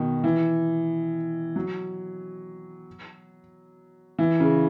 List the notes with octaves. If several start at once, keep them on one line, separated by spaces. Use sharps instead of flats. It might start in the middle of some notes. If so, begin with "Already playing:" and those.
Already playing: B2 D#3
E3
F#3
E3
C#3